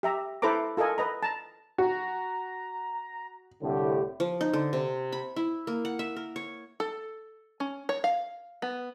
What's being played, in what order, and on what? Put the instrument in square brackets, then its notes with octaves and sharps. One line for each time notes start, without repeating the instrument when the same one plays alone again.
[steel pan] G4 E5 A#5
E4 A4 B4 C5 A#5 D6
F4 A4 A#4 D#5 G#5
B4 D#5 A#5
A5 A#5
[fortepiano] F#4 [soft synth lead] A#5
[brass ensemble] C2 A2 D3 [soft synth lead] G4
[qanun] F3
D#4
D3
C3
B5
E4
A#3
F#5
E5
A#4
C#5
[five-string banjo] A4
C#4
C#5
F5
B3